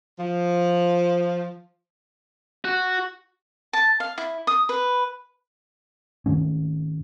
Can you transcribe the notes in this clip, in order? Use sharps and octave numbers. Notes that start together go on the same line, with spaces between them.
F3
F#4
A5
F5
E4
D#6
B4
G#2 D#3 A3 C#4